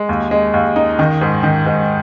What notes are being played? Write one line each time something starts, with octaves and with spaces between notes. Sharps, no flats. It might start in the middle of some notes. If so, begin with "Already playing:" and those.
Already playing: G#3
D#2
G#3
D#2
D#4
D#3
G#2
D#3
G#2